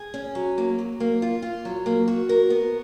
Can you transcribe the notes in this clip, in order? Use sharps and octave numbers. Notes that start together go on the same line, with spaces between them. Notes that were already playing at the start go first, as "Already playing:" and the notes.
Already playing: G#4
C#4
F#3
A#3
F#3
A#3
F4
F4
F#3
A#3
F#4
A#4
B3